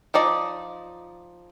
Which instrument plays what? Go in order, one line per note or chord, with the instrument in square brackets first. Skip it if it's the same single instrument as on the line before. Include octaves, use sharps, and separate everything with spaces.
[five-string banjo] F3 D#4 D5 D#5